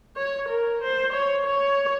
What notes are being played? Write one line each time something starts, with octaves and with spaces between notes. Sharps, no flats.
C#5
A#4
C5
C#5
C#5